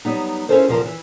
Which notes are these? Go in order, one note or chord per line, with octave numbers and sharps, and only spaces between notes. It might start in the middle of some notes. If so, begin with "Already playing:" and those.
F#3 G3 B3 D#4
C#4 E4 F4 A4 A#4 C5
E2 C3 F3 F4 A#4
E3